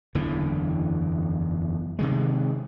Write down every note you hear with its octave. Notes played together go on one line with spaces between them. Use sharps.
F#1 E2 D3 E3
C3 D#3 G#3